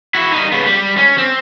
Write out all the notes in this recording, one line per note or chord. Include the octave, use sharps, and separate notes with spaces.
E4 F#4
G3 D#4
C#3 B3
G3
C#4
C4